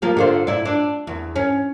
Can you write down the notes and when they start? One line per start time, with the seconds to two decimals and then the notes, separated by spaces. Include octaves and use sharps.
0.02 F3 A#3 G4
0.17 D3 F4 C5
0.47 A#2 E4 D5
0.65 D4
1.07 E2
1.36 C#4